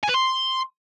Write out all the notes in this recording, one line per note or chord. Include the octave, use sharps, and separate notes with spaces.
G#5
B4
C6